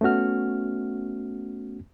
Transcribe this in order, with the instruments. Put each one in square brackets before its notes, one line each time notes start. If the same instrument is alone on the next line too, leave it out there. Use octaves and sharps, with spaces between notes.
[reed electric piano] A3 B3 C#4 F#4 F6